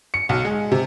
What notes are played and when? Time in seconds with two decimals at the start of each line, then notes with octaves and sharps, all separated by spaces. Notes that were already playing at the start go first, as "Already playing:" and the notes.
0.14 C#7
0.29 B1
0.45 G#3
0.72 C3